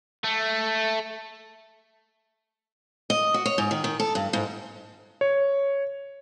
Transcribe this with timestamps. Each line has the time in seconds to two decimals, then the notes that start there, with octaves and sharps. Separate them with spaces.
0.24 A3
3.10 D#5
3.34 F#4
3.46 C#5
3.58 G#2
3.71 D#3
3.84 D#3
4.00 A4
4.15 G2
4.33 G#2
5.21 C#5